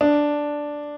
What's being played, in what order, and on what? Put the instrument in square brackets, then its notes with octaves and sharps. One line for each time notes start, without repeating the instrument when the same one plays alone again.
[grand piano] D4